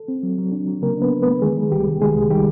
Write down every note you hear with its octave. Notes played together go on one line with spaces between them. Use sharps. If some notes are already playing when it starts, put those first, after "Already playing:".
Already playing: A4
C4
F#3
F#3
D4
F#3
C#3 A#3 A#4
B3 D4 B4
D4
A3 B3 B4
D#3 G#3 G#4
D#3
C2 G3 G4
C2
D#3 G#3 G#4
C2
D#3 G3 G4